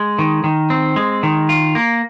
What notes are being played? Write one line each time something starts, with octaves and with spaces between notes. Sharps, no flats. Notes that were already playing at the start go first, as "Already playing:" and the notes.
Already playing: G#3
D#3
D#3
C4
G#3
D#3
F4
A#3